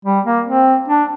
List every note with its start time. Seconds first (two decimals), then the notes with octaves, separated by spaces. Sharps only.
0.05 G3
0.25 A#3
0.46 C4
0.88 D4